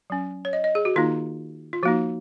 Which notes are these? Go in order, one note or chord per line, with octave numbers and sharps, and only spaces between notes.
F#3 C#4
C#5
D#5
D#5
G#4
F#4
D#3 A#3 D#4 F4
F4
F3 A#3 D#4 F#4